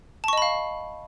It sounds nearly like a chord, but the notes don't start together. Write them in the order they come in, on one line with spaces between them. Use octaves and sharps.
A5 C#6 D#5 B5 F5